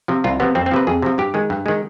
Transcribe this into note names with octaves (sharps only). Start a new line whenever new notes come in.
C3 F3
C2 F4
C3 F3 B3
F2 C4
C4
C3 F3 B4
F2 G#4
C3 F3
G2 G4
D#3 G#3
G2
D#3 G#3